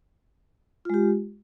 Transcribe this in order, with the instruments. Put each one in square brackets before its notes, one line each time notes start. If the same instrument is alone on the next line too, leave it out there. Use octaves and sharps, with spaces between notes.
[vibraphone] F4
G#3
G4